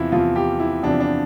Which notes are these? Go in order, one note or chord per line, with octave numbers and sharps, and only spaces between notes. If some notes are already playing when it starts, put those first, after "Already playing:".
Already playing: E2 C3 F3 E4 F4
E2 C3 F3 F4
G4
E4
E2 C3 F3 D4
D4